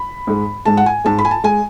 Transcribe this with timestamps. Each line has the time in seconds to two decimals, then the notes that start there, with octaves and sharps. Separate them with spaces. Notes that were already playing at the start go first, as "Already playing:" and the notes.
Already playing: B5
0.27 G#2 G#3
0.65 G#2 G#3 A5
0.77 F#5
0.86 G#5
1.05 G#2 G#3 A5
1.19 B5
1.25 G#5
1.31 A5
1.44 G#3 G#5